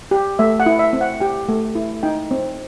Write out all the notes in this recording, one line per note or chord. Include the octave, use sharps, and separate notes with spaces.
G4
A3 E5
F#5
E4
E5
C4
F#5
G4 G5
A3
E4
D#4 G5
C4